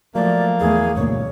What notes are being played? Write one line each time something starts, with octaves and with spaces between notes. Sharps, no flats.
F3 F#3 A3 A#3 D5
E2 A3 G#4
D2 G2 B2 A#3 C#5